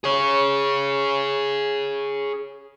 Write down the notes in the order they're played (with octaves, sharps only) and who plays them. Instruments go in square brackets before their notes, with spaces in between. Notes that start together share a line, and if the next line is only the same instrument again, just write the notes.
[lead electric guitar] G#4 C#5